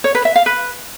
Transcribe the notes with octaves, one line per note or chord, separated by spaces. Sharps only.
C#5
B4
E5
F5
B4